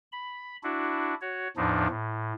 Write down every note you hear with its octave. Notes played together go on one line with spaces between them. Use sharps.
B5
D4 E4 F#4
F#4 C#5
E2 A2 F3 D4 D#4
A2